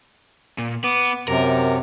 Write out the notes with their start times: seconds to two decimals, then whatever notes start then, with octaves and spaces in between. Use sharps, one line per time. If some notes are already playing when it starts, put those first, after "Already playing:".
0.58 A#2
0.84 B3 D6
1.28 F#2 C3 A#4